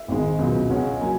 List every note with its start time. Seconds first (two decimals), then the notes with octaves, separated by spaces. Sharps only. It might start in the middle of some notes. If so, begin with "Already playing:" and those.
Already playing: E5
0.08 G#1 G#2 D#3 G#3
0.39 C#2 B2 F#3
0.70 C#2 C#3 G#3 C#4 F#5
1.01 F#3 A#3 G#5